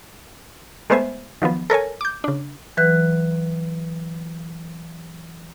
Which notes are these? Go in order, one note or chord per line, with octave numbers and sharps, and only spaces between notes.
G#3 A3 B3 C5 E5 G#5
D#3 F3 F#3 B3
A4 A#4 C#5 G#5
D6 G6
C#3 D4
E3 F#3 B4 F#6